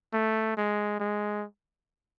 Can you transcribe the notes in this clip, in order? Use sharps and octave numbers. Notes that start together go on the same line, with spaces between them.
A3
G#3
G#3